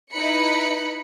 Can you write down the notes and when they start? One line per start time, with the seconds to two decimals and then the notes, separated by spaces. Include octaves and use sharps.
0.13 D#4 E4 B4 B5 F#6 C#7